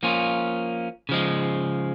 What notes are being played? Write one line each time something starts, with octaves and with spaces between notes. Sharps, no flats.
F3 A#3 C#4 F4
C#3 F3 G#3